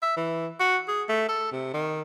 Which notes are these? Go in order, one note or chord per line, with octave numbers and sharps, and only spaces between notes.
E5
E3
F#4
G#4
A3
A4
C3
D#3